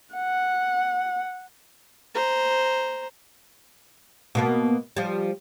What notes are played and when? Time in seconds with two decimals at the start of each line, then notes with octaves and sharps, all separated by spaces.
0.15 F#5
2.15 C5 A#5
4.35 B2 A#3 B3
4.97 F3 G3